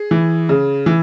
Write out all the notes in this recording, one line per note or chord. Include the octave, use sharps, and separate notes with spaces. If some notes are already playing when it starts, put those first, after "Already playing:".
Already playing: G#4
E3
C#3
E3